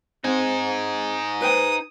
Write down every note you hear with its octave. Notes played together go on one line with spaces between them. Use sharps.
C4 D#4 G#4
B4 C5 G5 D#6